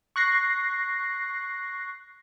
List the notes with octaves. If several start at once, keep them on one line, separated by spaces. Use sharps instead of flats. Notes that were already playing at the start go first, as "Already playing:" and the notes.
C#6 F#6 A#6 C7